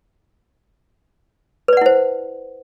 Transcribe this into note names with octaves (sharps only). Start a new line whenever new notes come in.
E4 B4 C5 D5 F#5